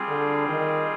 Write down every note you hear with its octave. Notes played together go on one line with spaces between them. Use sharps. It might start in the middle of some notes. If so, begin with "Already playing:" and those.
Already playing: G3 C4 F4 G#4
D3
D#3